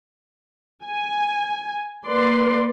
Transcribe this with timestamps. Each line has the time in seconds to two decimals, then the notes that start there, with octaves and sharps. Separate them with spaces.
0.84 G#5
2.07 A#3 B4 D5 C6